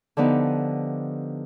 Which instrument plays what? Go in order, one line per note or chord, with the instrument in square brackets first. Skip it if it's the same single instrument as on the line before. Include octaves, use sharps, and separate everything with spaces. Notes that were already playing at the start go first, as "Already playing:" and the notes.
[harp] D3 F3 B3 D#4 G4